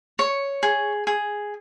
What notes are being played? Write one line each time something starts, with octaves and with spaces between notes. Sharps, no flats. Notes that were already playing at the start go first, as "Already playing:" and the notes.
C#5
G#4
G#4